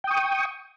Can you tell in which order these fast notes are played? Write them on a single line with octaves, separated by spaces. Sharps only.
G5 D#6 C#6